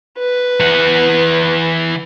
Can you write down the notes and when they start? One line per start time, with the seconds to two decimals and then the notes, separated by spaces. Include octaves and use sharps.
0.18 B4
0.60 E3 F#5